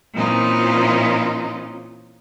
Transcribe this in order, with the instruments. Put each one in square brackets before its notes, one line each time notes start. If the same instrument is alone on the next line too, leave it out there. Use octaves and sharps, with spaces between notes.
[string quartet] A#2 E3 C4 C#4 D#4 F4